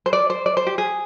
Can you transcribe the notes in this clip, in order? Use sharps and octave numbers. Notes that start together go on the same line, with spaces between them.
C5
D5
C5
D5
C5
G4
G#4